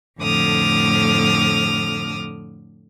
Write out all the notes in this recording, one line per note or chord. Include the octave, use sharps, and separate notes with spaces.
F2 A2 D3 D6 D#6 F6